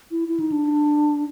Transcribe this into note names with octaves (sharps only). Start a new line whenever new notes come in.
E4
E4
D#4
D4